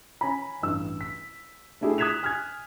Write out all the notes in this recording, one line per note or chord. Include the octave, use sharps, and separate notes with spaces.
C#4 G#5 A#5 B5
A1 G2 E6
B6
A3 D4 E4 G4 G#4
D#6 F#6 G#6 B6 E7 F7
G#5 F6 F#6 G#6